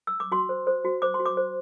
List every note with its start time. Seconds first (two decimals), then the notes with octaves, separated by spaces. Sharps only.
0.07 E6
0.20 D6
0.32 F#4 C6
0.49 C5
0.67 C5
0.85 F#4
1.02 C5 D6
1.14 C6
1.20 F#4
1.26 D6
1.37 C5